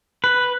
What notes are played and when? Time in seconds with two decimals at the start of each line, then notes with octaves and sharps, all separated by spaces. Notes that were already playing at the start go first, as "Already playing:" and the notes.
0.24 B4